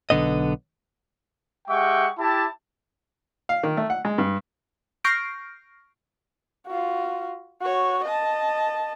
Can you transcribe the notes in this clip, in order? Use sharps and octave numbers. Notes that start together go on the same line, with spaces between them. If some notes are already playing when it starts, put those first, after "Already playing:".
B1 G#2 D3 B3 D#5
G#3 G4 E5 F#5 G5 C#6
E4 G4 A5
F5
D#3
A3
F#5
G#3
G2
C#6 F6 G6 A#6 C7 D7
F4 F#4
F#4 C#5
D#5 A5